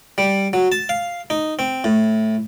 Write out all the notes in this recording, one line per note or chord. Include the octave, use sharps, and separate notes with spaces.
G3
F#3
A5
F5
D#4
C4
A2